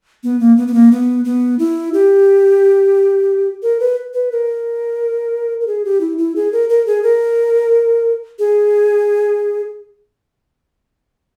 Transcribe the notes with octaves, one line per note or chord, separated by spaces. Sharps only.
B3
A#3
B3
B3
A#3
B3
B3
E4
G4
A#4
B4
B4
A#4
A#4
G#4
G4
E4
E4
G#4
A#4
A#4
G#4
A#4
G#4